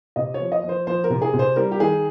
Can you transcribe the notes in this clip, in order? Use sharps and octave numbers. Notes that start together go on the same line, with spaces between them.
C3 D#5
C#5
F3
D#5
F3
C5
F3 C5
A#4
C3
G#4
C3
C5
G3 A#4
G4
D#3 G#4